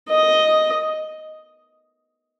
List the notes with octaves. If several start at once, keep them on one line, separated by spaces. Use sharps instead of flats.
D#5